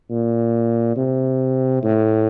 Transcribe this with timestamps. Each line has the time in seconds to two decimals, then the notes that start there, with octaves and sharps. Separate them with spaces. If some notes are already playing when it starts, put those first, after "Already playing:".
0.10 A#2
0.97 C3
1.83 A2